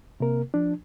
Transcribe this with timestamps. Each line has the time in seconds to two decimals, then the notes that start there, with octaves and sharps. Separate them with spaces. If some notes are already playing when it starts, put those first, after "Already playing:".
0.20 C3 A#3 A#4
0.54 F3 D4